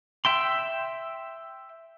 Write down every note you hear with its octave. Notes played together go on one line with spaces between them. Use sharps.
E5 G5 C6